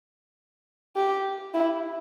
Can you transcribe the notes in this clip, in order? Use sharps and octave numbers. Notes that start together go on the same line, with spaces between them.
G4
E4